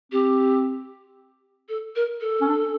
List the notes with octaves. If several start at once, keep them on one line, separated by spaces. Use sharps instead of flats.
C4 G4
A4
A#4
A4
C#4
D4